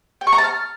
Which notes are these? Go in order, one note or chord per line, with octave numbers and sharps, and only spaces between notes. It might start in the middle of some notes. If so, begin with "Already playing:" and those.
G5
C#6
A#5
A5
F6